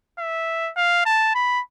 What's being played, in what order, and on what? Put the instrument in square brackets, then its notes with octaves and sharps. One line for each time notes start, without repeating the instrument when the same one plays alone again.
[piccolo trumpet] E5
F5
A5
B5